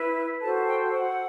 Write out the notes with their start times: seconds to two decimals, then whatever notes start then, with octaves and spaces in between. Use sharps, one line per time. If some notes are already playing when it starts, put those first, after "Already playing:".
Already playing: E4 B4
0.41 F#4 A4 C5 A5
0.66 G5
0.90 F#5